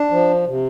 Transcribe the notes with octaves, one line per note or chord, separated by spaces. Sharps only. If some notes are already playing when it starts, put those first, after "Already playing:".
Already playing: D4
F3
C3